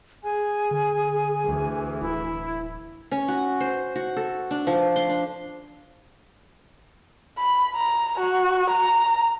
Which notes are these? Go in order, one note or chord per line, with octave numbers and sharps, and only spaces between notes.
G#4 G#5
D3
D2 E3
D1 E4
C#4
F#4
C5
F#4
A4
D4
F3
C6
D4
B5
A#5
F#4
A#5